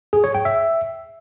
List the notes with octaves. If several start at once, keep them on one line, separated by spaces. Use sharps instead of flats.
G#4
C#5
G5
E5